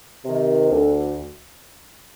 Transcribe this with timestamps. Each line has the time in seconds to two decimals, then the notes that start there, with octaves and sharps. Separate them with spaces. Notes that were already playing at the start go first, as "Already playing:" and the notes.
0.25 C3 D#3
0.70 D2